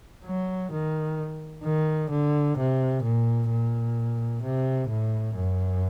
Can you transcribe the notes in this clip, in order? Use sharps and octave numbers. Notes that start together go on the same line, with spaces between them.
F#3
D#3
D#3
D3
C3
A#2
A#2
C3
A2
F#2